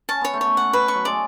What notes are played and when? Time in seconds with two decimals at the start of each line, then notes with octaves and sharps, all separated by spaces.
0.09 C#4 A5
0.21 B3 C#5
0.33 A3
0.41 B3 C#5
0.57 F#5
0.73 B4
0.88 C#6
0.94 F#3
1.05 G#3 D5